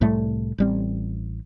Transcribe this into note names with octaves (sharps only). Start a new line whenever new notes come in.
C2 A2 G3 A3
A1 G3 C4